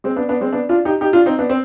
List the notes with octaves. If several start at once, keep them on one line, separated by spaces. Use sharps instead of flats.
G#3 C4
B3 D4
B3 D4
G#3 C4
B3 D4
D4 F4
D#4 G4
D#4 G4
D4 F4
C4 D#4
B3 D4
C4